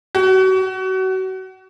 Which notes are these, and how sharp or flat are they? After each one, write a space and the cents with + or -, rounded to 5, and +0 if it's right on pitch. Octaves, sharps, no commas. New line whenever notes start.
F#4 +30